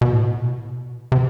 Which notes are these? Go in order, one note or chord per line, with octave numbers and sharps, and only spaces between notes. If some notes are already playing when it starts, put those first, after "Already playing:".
B2
A2
B2
C3